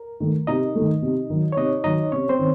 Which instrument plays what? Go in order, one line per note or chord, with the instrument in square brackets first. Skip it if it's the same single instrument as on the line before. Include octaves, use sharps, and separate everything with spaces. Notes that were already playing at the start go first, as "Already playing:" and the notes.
Already playing: [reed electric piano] A#4
[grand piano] D#3 A3
[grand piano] C3 [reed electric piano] D#4 D#5
[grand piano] D#3 A3
C3
D#3 F#3
[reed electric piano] C#5
[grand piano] C3 [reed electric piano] D#4 D#5
[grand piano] D#3 F#3 [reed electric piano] D#4 D#5
[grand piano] C3 [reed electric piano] C#4 C#5
[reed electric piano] C4 C5
[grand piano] D#3